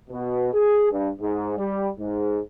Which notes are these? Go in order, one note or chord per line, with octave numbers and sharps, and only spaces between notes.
B2
G#4
G2
G#2
G3
G#2